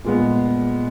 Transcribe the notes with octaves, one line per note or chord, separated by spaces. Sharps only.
A#2 G#3 B3